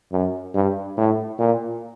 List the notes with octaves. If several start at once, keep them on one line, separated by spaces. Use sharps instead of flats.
F#2
G2
A2
A#2